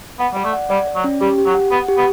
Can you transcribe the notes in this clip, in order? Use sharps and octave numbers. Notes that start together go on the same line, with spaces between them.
B3 F#5
G3 D5
A3
F#5
G3 D5
D5
F#3
C#4
G3 G4
G4
F#3
F#5
B3 F#5
G4
B3